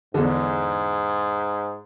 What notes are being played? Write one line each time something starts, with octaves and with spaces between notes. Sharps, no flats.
E2 G#2 D3